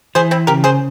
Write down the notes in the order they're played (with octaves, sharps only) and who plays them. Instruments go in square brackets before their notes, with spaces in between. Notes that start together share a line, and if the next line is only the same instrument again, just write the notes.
[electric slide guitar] E3 [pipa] G#4 C5
[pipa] C4 E4
[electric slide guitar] C#3 [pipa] G4 A#4
[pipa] G#4 C5